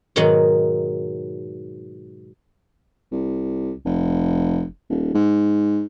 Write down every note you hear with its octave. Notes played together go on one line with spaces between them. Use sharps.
G#2 B2 D#3 F#3 D#4 F#5
C2
F1
D#1
G#2